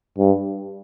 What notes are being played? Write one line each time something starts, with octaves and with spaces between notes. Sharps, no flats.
G2